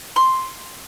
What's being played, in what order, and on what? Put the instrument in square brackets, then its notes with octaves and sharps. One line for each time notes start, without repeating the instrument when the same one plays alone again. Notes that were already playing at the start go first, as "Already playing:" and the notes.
[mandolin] C6